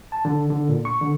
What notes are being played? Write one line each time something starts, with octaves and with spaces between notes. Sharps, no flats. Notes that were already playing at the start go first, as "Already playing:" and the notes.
A5
D3
D3
A#2
C#6
D3